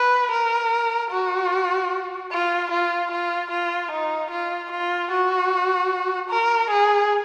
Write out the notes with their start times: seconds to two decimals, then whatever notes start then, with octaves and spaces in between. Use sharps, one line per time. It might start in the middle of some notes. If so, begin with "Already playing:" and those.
Already playing: B4
0.32 A#4
1.11 F#4
2.31 F4
2.71 F4
3.11 F4
3.51 F4
3.91 D#4
4.31 F4
4.72 F4
5.11 F#4
6.30 A#4
6.71 G#4